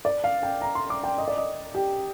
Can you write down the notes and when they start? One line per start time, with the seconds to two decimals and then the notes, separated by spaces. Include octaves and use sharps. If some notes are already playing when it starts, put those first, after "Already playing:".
0.05 D5
0.24 F5
0.43 G5
0.62 A#5
0.75 C6
0.90 D6
1.04 G5
1.18 D#5
1.28 D5
1.37 D#5
1.75 G4